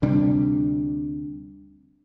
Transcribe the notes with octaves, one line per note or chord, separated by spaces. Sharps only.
D2 C3 G3 D4